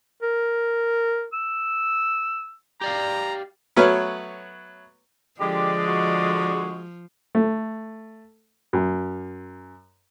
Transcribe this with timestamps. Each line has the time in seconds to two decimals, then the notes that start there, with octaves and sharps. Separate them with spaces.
0.23 A#4
1.33 E6
2.81 G4 D5 F5 A#5
3.76 F#3 A3 B3 B4 C#5 F6
5.40 D3 F3 G#3 G4 D5
5.87 F#4
7.35 A3
8.73 F#2